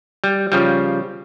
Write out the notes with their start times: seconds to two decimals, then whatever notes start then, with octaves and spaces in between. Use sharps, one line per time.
0.24 G3
0.52 C#3 F3 G3